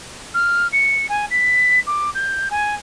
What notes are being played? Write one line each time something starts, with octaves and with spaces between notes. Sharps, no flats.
F6
C#7
G#5
B6
D6
G6
G#5